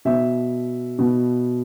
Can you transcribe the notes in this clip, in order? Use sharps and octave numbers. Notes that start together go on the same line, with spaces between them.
B2 E5
B2